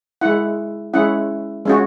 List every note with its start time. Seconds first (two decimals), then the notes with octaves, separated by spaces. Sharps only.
0.21 G#3 E4 F#5
0.93 G#3 C#4 E4 F#5
1.65 G#3 C#4 F#4